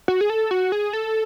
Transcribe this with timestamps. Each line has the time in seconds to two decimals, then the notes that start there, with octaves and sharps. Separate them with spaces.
0.08 F#4
0.21 G#4
0.30 A4
0.51 F#4
0.72 G#4
0.93 A4